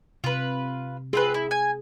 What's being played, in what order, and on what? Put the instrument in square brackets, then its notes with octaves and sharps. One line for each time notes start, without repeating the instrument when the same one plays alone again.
[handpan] C3 [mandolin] F4 B4
[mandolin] C4 F4 B4 [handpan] G#4
[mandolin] E4
G#5